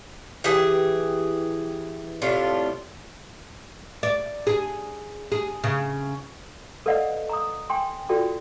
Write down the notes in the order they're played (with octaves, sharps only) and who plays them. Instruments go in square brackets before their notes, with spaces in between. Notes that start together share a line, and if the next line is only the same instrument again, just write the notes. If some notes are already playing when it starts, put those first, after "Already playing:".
[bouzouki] E3 G4 G#4
A2 C3 D4 F4
[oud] D5
G#4
G#4
C#3
[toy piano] A4 B4 D5 D#5 F5 F#5
A#5 D#6
G5 G#5 C6
F4 F#4 A4 D5 G5